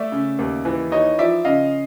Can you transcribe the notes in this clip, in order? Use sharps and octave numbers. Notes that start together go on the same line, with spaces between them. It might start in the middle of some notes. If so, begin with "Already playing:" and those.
Already playing: A3 D5 E5
C#3
D#2
E3
D#4 C#5 D#5
F3 D5 E5
C#3 D#5 F5